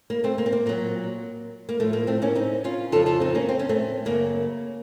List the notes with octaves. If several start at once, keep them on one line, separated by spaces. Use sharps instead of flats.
A#3
A3 C4
A#3
C4
A#3
A#2 F#3 A#3
A#3
A2 F3 A3
A#3
A3 C4
A#3 C#4
C4 D#4
C#4 F4
F2 C#3 F3 F4 A4
F4 A4
C4 D#4
A#3 C#4
C4
C#4
A3 C4
F#2 C#3 F#3 A#3